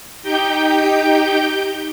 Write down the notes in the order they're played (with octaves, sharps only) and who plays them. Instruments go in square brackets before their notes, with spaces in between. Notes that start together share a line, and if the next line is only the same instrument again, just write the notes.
[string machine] D#4 G4 G5 G6